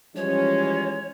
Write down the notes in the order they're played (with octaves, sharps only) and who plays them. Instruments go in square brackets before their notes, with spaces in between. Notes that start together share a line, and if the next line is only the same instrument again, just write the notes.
[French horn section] E3 F3 G3 [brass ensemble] G#3 C#4 [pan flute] C#5